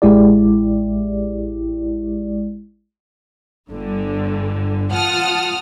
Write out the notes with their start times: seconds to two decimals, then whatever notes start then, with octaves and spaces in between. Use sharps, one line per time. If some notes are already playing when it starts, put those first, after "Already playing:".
0.02 A1 G#3 E4 G4 D5
3.72 G1 G2 D3
4.94 F4 F#5 A5 D#6 F6